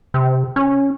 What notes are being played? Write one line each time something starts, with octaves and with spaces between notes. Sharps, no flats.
C3
C#4